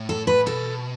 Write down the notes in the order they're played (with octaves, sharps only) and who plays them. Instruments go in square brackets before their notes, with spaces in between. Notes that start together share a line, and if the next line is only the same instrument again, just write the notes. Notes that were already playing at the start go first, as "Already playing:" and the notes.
Already playing: [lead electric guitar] A2
[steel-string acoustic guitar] A4
B4
[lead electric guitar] B2 [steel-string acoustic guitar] A4